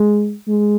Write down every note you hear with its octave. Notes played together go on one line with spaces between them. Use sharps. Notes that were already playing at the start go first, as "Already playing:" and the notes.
Already playing: G#3
G#3